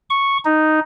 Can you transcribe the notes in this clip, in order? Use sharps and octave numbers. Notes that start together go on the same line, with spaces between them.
C#6
D#4